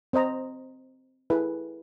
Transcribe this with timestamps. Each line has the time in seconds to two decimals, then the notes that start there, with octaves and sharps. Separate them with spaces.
0.13 C4 C5 D#5 A#5
1.30 E4 G#4 A4 B4